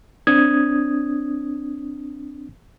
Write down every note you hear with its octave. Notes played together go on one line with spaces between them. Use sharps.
C4 D4 D#6 G#6